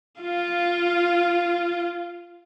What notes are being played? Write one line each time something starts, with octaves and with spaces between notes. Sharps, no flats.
F4 F5